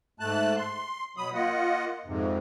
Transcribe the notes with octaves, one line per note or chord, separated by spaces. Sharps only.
G#2 A3 A5 F#6
C6
B2 F#3 B5 D#6
A#3 F4 D#5 F#5
F2 G#2 C3